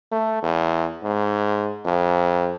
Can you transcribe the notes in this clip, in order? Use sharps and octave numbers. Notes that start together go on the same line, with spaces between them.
A3
E2
G#2
F2